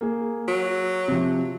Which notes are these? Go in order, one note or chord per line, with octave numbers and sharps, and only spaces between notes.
A#3 G#4
F#3
C3 F3